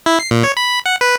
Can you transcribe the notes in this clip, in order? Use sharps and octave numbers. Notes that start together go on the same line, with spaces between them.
E4
C7
A#2
C#5
B5
F#5
B4